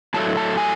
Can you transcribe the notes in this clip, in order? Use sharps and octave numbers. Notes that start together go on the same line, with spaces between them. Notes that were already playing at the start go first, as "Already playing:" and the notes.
A2 F#3 A3 A5
A5
G#5